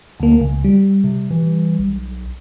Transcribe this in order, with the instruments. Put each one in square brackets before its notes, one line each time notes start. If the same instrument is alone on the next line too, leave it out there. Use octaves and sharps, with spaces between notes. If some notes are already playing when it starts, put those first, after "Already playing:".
[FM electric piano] D2 A#3
C#2
G3
[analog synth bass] C3
E3
B1